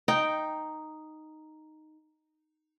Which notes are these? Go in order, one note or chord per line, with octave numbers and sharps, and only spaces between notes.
D#4 G5